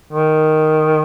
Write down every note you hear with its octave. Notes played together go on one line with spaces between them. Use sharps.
D#3